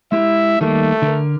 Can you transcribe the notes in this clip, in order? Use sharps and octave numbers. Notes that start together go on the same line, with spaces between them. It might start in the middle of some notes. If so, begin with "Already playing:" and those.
G#3 E4 G4 E5
D#3 G3 A3 A#3
D3 A#4